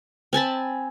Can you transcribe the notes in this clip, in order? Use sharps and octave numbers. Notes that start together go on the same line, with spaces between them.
C4 G#5 A5 B5